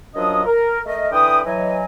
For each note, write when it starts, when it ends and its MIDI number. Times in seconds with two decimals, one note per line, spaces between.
0.15 0.44 42
0.15 0.44 53
0.15 0.44 54
0.15 0.44 62
0.15 0.44 75
0.15 0.44 87
0.46 0.79 70
0.86 1.09 57
0.86 1.09 70
0.86 1.09 75
1.11 1.40 50
1.11 1.40 52
1.11 1.40 71
1.11 1.40 79
1.11 1.40 87
1.45 1.85 52
1.45 1.85 54
1.45 1.85 75
1.45 1.85 80